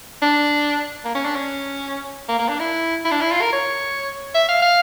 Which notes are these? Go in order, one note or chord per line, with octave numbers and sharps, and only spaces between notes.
D4
A#3
C#4
D4
C#4
A#3
A#3
D4
E4
E4
D4
E4
F4
A#4
C#5
E5
F5
F5